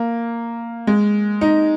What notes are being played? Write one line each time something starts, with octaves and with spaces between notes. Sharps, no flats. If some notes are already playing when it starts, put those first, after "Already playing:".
Already playing: A#3
G#3
D#4